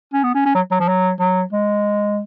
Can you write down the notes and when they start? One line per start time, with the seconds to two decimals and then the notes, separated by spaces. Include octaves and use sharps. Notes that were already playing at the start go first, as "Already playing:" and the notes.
0.14 C#4
0.23 B3
0.35 C#4
0.46 C#4
0.55 F#3
0.71 F#3
0.80 F3
0.88 F#3
1.20 F#3
1.53 G#3